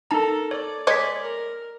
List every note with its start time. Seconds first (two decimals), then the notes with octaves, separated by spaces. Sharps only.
0.11 D#4 A4 A#4 A5 A#5
0.51 C#5 D5
0.87 G#3 C#5 D#5 D6 G#6 B6
1.22 A#4